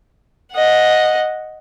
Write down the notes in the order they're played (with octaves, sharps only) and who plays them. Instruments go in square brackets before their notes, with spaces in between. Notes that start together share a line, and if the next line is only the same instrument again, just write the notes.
[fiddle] D#5 F#5